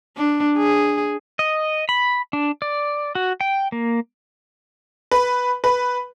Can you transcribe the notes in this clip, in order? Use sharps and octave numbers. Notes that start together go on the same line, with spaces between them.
D4
G#4
D#5
B5
D4
D5
F#4
G5
A#3
B4
B4